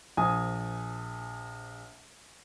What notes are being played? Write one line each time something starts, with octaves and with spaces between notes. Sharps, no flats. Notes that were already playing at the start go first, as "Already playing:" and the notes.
A#1 G#5 D#6